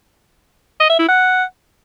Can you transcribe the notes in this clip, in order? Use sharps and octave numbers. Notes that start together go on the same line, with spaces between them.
D#5
E5
E4
F#5